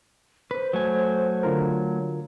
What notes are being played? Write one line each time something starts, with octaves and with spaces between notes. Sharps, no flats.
B4 C5
F#3 A3 G#5
D3 F4 A#4